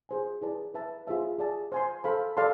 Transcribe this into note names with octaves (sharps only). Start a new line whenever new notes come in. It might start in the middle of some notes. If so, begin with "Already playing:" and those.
G#4 C5 G#5
E4 G#4 B4 D5 A5
B4 E5 A5
F4 G#4 C5 E5 A5
G#4 D5 A5
C5 G#5 C6
A4 C5 F5 B5
A4 D5 F5 A5 C6